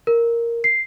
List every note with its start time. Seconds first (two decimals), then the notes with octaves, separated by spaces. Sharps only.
0.07 A#4
0.64 C7